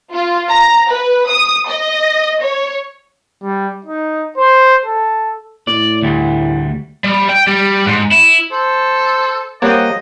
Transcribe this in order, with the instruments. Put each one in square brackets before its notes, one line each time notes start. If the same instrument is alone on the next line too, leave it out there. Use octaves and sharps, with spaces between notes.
[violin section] F4
A#5
B4
D#6
D#5
C#5
[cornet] G3
D#4
C5
A4
[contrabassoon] A2 [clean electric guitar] D5
[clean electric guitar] D2 G3
[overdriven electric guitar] G3
G5
G3
G#2
E4
[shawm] A4 [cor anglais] C5
[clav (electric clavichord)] G3 A#3 [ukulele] C5 C#5 [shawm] D#5 [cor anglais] F#5